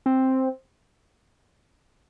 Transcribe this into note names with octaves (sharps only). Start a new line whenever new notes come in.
C4